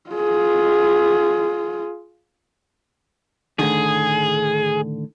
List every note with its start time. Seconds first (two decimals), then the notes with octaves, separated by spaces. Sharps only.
0.10 F4 G#4
3.59 A2 D3 D#3 G#4